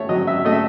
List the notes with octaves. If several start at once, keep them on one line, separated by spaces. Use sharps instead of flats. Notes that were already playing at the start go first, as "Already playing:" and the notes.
Already playing: A3 C#5
F#3 D#5
E5
A3 D#5
E5